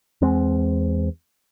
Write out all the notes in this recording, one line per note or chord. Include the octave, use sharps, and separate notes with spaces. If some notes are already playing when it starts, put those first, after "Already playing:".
E2 G#3 C4